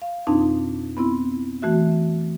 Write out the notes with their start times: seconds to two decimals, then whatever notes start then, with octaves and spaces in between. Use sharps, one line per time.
0.02 F5
0.27 F2 B2 C4 D4 D#4
0.97 B3 C4 E4
1.62 E3 A3 F#4 E5